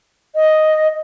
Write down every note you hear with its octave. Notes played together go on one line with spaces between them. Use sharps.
D#5